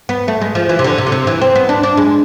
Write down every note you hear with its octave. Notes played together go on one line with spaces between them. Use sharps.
B3
A3
G#3
F3
E3
C3
D3
C3
D3
C3
E3
C4
B3
D4
D4
G#3